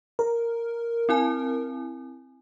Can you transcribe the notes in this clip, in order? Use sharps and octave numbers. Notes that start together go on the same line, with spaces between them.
A#4
C4 E4 G#5